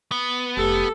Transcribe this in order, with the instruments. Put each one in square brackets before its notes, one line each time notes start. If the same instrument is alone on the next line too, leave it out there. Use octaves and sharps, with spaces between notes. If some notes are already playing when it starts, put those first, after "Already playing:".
[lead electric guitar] B3
[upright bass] F1 [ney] G4 [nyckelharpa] A4